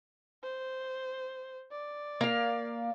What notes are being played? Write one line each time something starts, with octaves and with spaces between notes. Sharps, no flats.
C5
D5
A#3 F5